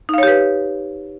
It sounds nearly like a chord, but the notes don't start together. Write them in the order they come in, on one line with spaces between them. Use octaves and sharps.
D#4 F5 C#5 G4 B4